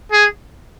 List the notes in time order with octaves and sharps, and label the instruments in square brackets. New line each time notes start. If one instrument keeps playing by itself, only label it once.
[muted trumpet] G#4